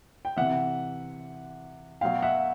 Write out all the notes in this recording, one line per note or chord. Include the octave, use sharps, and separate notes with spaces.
G5
C3 E3 E5 F#5
B2 F#3 F5 G5
E5 F#5